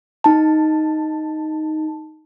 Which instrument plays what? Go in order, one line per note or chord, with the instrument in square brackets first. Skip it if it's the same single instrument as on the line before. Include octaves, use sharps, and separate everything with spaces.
[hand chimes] D#4 A5